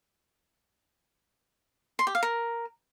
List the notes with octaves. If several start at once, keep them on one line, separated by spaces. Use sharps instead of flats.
C6
G4
F5
A#4